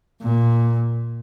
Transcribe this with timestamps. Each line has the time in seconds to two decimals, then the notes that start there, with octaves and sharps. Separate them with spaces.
0.22 A#2